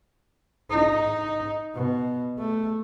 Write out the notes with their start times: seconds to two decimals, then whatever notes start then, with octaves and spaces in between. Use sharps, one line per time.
0.70 D#4
1.75 B2
2.38 A3